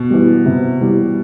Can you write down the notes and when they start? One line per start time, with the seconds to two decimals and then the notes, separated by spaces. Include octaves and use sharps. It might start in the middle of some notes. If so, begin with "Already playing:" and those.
Already playing: B2
0.10 E3 G3
0.46 C3
0.80 E3 G3